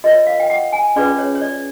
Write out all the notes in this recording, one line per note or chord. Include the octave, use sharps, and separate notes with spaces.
F4 A#4 C#5 D#5
F5
G5
F#5
G#5
C#4 F4 G#4 B4 D5
C#5
C#5
D5